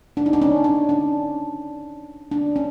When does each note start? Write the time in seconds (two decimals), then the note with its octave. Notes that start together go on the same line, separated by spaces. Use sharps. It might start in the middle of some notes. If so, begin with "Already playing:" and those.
0.17 D4
0.26 D#4
0.33 D4
0.42 C#4
0.64 D4
0.89 D4
2.31 D4
2.56 C#4